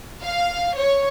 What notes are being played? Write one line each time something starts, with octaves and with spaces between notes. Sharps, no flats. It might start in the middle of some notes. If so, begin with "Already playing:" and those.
F5
C#5